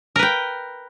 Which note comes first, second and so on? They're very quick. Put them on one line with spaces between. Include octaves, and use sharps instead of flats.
A#4 B4 G5